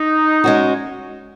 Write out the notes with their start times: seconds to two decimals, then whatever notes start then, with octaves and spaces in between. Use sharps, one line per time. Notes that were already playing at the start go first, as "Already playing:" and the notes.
Already playing: D#4
0.44 G#3 C#4 F#4